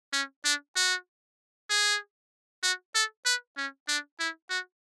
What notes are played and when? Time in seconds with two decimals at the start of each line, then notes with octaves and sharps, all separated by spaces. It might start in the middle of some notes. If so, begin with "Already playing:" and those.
0.13 C#4
0.45 D4
0.76 F#4
1.69 G#4
2.63 F#4
2.95 A4
3.26 B4
3.57 C#4
3.88 D4
4.19 E4
4.50 F#4